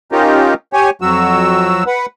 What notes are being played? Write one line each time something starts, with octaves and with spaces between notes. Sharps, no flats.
C#4 D#4 F4 G4 A#4
G4 C#5 G#5
F2 F#3 F#4 E6
B4 F#5